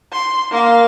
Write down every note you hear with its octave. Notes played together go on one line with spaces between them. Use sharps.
C6
A#3 F5